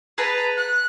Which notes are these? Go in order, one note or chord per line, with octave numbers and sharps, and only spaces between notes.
G#4 B4 A5 A#5
F#6